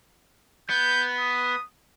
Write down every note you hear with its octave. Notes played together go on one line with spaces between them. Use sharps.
B3 G6
D#6